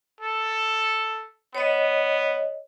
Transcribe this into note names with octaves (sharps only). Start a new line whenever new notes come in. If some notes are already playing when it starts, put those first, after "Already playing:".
A4
B3 C#5 D#5